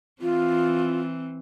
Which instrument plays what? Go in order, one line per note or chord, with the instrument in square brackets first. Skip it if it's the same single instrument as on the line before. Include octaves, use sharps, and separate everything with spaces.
[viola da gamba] E3 C4 [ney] F4